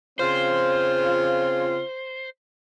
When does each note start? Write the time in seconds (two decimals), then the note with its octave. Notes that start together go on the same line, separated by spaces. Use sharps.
0.19 C#3 C4 F4 C5